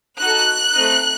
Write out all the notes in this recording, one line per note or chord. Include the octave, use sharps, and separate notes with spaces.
D#4 F#4 A4 F#6
A3 C4 D#4